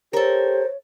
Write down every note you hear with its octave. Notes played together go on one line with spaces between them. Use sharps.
G4 A4 A#4 C5 C#5